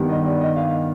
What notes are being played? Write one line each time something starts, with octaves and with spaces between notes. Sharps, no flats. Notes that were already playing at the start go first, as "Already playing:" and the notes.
Already playing: G2 D#3 G3 B3
D#5
D5
D#5
F5